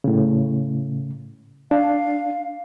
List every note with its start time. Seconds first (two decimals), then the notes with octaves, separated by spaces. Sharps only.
0.04 A2 C#3
1.71 D4 F5